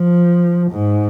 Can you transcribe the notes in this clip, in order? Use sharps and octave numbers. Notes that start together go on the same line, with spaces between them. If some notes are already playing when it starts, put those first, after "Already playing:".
Already playing: F3
G#2